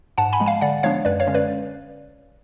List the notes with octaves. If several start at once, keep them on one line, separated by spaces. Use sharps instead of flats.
G#2 F#5 A5
G#5 B5
F3 G#3
F5 G#5
D3 D5 F#5
F3 G#3 B3 D4 C#5 F5
F#2 B4 D5
C#5 F5
D3 G#3 C#4
B4 D5